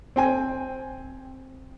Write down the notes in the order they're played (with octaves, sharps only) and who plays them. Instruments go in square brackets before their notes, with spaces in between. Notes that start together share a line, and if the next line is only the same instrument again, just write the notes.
[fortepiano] C4 G5 G#5